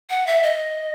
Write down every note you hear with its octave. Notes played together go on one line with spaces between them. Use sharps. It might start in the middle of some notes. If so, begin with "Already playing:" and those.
F#5
E5
D#5